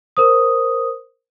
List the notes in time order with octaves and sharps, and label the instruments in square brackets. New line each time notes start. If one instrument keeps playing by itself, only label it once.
[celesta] A#4 C5 D#6